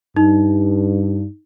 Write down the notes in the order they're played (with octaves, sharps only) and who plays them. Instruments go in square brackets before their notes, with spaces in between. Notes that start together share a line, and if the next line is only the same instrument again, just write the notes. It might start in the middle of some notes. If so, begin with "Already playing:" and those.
[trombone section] G2 [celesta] D#4